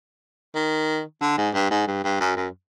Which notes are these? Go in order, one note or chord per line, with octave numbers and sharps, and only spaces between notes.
D#3
D3
G#2
G2
G#2
G2
G2
F#2
F#2